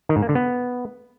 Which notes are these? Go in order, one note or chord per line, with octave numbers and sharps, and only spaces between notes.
D#3
G#2
A#3
D3
B3